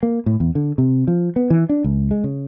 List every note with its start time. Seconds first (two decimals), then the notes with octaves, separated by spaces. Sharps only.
0.03 A#3
0.26 A2
0.40 E2
0.55 D3
0.78 C3
1.07 F3
1.36 B3
1.50 E3
1.69 D4
1.84 C#2
2.11 G#3
2.24 C#3